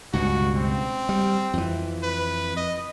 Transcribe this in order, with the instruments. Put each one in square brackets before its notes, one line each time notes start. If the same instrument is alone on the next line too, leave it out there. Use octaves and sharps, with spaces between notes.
[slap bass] C#2 G2 B2 [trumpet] F#4
[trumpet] C4
[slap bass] G3
F2 E3
[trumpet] B4
D#5